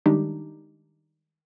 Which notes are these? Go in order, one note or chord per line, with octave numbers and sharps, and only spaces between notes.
D#3 G3 G#3 D4 D#4 G4